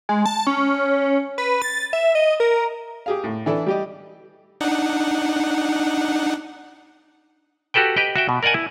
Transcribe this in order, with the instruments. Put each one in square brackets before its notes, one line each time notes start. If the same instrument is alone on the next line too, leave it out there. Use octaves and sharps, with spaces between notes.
[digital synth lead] G#3
A5
C#4
B4
A6
E5
D#5
A#4
[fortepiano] G4 G#4 F5
A2
E3 D4 E4 A4 D5
G3 G4 D#5
[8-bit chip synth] D4 D#4 F#5
[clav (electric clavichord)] F#4 G4 A4 B4 G5
G4 B4 D#5 G5
F#4 E5 G5
B2
A#4 D5 D#5 F#5 G#5
E4